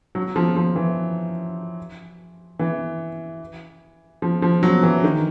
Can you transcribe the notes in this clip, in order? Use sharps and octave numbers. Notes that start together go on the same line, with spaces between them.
F#3
F3
F3
E3
E3
F3
F3
F#3
E3
D#3